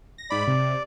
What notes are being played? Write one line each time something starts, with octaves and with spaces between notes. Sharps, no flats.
A#6
G#2 D5 B5
C3